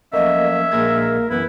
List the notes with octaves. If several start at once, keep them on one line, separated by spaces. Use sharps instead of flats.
F3 F#3 A3 A#3 C#4 D#5 E5
A#1 G#3 A#3 A#4 G#6
F#2 E3 B3 E4 B4